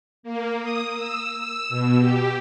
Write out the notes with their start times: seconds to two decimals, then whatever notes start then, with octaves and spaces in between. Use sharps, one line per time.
0.23 A#3
0.61 D#6
0.94 E6
1.35 E6
1.69 B2
1.99 G4